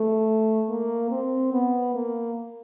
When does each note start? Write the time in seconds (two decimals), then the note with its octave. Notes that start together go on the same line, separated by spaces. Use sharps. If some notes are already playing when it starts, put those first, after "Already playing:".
Already playing: A3
0.69 A#3
1.11 C4
1.52 B3
1.94 A#3